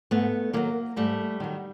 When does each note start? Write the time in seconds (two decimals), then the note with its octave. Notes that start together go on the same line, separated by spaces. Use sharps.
0.11 G#2 A3 B3
0.53 D#3 F#3 G#3 A#3
0.96 G#2 G3 A3
1.40 D#3 F#3